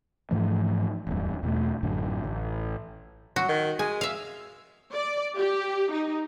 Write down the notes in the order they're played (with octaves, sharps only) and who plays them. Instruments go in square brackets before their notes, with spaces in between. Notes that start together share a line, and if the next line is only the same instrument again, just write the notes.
[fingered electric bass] G#2 E3 F3 A3
D1 E2 G2
E2 B2 A3
A1 F#2 A2 D3
A1
[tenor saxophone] F#3 [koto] F#4
[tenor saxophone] D#3
[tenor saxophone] G#3 [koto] G#5
[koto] E5 F5
[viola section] D5
G4
D#4